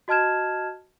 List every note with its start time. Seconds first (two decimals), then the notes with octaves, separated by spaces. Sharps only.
0.08 F#4 D#5 A5 F6 G#6 E7